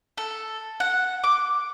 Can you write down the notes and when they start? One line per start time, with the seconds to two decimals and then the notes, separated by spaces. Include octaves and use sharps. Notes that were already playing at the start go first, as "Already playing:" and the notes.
0.18 A4
0.80 F#5
1.24 D6